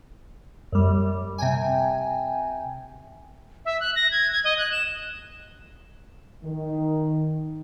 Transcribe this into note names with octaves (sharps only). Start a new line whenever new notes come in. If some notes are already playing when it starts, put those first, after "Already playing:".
F#2 G3
C3 G5 G#5
E5
F#6
A#6
G#6
G#6
D#5
F#6
E7
D#3